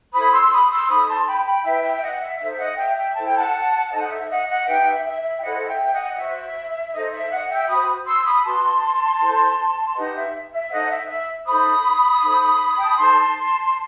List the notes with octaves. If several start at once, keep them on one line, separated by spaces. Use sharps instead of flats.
E4 A4 C5 B5 D#6
C6 E6
B5 D#6
C6 E6
D#4 A4 C5 B5 D#6
A5 C6
G5 B5
G5 B5
E4 B4 E5 G5
E5 G5
E5
D#5 F#5
E5
D#4 A4 C5 E5
D#5 F#5
E5 G5
E5 G5
E4 A4 C5 A5
G5
F#5 A5
D#4 A4 C5 D#5
F#5
E5
D#5 F#5
D#5 F#5
D#4 G4 B4 E5 G5
F#5
E5
E5
E5
G5
E4 A4 C5 D#5 F#5
E5 G5
D#5 F#5
D#5
F#4 C5 E5
D#4 A4 C5 D#5
E5
D#5 F#5
E5 G5
F#4 C5 B5 D#6
C6 E6
B5 D#6
F#4 B4 A5 C6
E4 A4 C5
D#4 G4 B4 D#5 F#5
E5
E5
D#4 A4 C5 D#5 F#5
E5
E5
D#4 A4 C5 B5 D#6
D#4 A4 C5
G5
A5
B5
D#4 A4 C5 A5 C6